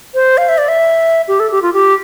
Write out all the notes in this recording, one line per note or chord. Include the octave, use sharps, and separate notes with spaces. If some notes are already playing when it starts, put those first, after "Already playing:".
C5
F5
E5
D5
E5
G4
A4
G4
F4
G4